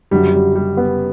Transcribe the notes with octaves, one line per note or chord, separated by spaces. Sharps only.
F#1 F#2 D3 F#3 G3
G3
G3
B3